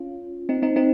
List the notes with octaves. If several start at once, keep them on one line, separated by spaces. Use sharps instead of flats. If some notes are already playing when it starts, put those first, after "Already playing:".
Already playing: C#4 F4
C4 D#4
C4 D#4
C4 D#4